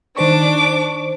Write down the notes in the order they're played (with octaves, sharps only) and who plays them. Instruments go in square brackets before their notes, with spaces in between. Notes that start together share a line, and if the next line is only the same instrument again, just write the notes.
[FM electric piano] D#3 C5 C#6 [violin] D4 D6